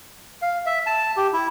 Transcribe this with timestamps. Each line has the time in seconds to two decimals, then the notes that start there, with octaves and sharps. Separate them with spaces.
0.42 F5
0.66 E5
0.87 A5
1.17 G4
1.33 E4